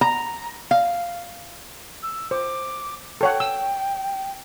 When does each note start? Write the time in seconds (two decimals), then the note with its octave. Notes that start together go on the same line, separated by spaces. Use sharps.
0.01 A#5
0.71 F5
2.03 E6
2.31 C5 D6
3.21 A4 C#5 F#5 G5
3.40 E6